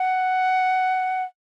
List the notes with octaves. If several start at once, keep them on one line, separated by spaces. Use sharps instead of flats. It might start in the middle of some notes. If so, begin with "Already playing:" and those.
Already playing: F#5